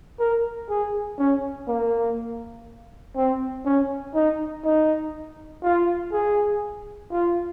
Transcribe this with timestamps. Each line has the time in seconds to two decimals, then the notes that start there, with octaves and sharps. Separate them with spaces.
0.19 A#4
0.69 G#4
1.18 C#4
1.68 A#3
3.16 C4
3.65 C#4
4.15 D#4
4.64 D#4
5.63 F4
6.12 G#4
7.11 F4